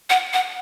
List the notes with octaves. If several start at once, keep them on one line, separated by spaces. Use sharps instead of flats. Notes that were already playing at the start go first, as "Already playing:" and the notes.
F#5
F#5